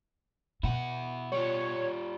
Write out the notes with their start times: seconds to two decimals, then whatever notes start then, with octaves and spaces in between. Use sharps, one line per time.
0.63 B2 E4 F#5
1.32 G3 F4 C#5